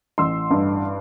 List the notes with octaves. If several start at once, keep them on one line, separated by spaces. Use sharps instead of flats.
A1 C6 E6
G2